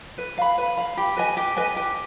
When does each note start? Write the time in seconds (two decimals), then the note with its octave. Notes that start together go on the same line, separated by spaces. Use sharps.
0.18 B4
0.38 F5 B5
0.58 B4
0.77 F5 B5
0.97 G4
1.16 B4 D#5 G#5
1.37 G4
1.57 B4 D#5 G#5
1.76 G4